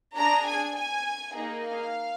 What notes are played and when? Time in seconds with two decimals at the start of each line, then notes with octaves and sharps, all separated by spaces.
0.16 D4 G#4 A#5
0.47 G#5
0.76 G#5
1.35 A#3 D#4 G#4
1.65 F5